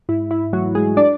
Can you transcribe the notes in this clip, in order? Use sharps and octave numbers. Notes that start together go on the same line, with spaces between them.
G#2 E4
E4
E3 F#3 A3 F#4
G#3 G#4
D4 D5